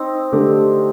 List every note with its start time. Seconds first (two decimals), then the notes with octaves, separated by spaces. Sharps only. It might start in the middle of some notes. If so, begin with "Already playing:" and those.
Already playing: C4 D#4
0.32 D3 A3 D4 G4